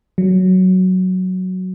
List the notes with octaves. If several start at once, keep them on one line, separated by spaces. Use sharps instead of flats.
F#3